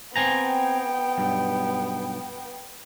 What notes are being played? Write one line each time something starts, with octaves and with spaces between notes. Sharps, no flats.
B3 C4 G5 G#5 A#5
B1 G2